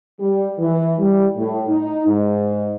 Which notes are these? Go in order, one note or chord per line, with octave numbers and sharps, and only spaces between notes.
G3
E3
G3
A2
D#4
G#2